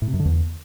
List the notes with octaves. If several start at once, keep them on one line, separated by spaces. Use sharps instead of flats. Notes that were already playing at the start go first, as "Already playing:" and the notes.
A2
C3
F#2
D3
E2